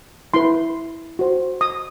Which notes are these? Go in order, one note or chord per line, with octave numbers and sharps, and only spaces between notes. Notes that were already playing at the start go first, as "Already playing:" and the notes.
E4 B4 C6
F#4 C5
D#6